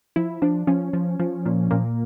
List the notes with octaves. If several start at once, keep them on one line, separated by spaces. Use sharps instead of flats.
F3 E4
F3 D4
F3 C#4
F3
F3
A#2
A#2 A#3